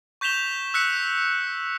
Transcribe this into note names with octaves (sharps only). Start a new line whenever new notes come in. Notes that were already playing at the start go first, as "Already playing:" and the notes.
C#6 G6 B6 E7 F7 G7
E6 F#6 B6 C#7